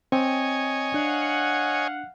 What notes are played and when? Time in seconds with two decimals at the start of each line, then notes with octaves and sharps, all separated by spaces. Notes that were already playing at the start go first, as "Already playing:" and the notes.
0.12 C4 C#5 D#5 G5 G#5
0.94 D4 F5 F#5